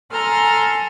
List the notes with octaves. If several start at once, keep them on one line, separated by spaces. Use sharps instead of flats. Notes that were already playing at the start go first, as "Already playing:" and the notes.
A4 G#5 A#5 C6 F6